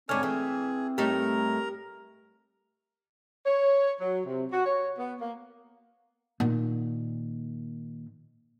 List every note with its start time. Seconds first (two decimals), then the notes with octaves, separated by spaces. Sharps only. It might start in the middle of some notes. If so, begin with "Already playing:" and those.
0.09 G#2 D3 C4 D4 C#5 G#5 F6
0.23 E3 G#4
0.98 A2 G3 D#4 G4 A#4 A#5
3.45 C#5
3.99 F#3
4.25 C3
4.52 F#4
4.66 C#5
4.98 B3
5.20 A#3
6.40 A#2 D#3